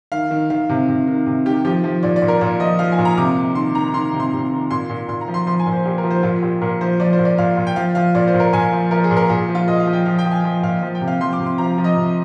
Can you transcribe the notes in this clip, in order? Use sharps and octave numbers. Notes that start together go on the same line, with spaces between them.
D#3 F5
D#3
D#3 F5
C3
C3
D#3
C3
D#3 G4
F3 G4
F3
A#2 D5
D5
A#2
A#4
A#2 D5
F3 D#5
F3 F5
G#5
A#2
A#5
C3 D6
C3
D#3 C6
D#3 A#5
D#3 C6
C3
C6
C3
D#3
A#2 C6
A#2
A#2 C6
A#5
F3
C6
F3 C6
G#5
A#2
C5
A#2 G4
A#4
F3
C5
A#2 F4
A#2 G4
A#2 A#4
F3 C5
F3 D5
C5
A#2
D5
A#2 F5
A#2
G5
F3 F5
F3 F5
A#2 D5
C5
A#2
A#4
A#2 G#5
F3
F3 A#4
G#4
A#2
A#4
A#2 G#4
F3
F4
A#2 D#5
F5
F3
G5
F3 F5
G5
F3
G#5
F3
A#2 F5
F3
G5
C3
F5
F3 C6
D6
C3
C6
F3 A#5
F3
D#5
C3